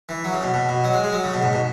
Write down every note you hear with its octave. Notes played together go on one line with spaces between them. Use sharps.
E3
F#3
C#3
B2
B2
B2
F#3
G#3
G#3
F#3
C#3
B2
G#2
B2